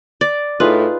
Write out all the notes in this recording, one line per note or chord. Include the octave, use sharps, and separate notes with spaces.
D5
A2 D#4 F4 G#4 B4